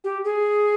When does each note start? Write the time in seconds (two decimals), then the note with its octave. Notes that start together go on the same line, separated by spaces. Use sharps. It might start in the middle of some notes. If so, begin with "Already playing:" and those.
0.04 G4
0.24 G#4